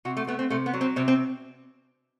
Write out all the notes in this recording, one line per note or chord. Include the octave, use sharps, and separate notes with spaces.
C3 F#4
A3
A3 B3
C4
C3 A3
B3
F#3
C4
C3 C4
C4